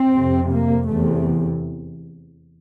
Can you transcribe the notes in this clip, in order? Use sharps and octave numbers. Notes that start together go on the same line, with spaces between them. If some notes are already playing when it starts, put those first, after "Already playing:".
Already playing: C4
F2 C3
A#3
E2 C3 A3